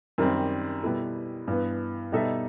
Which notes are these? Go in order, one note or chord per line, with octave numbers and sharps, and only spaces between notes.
F#2 D#3 G3 C4
B2 G3 B3 E4 A4
G2 E3 B3
B2 G3 D#4 A4 E5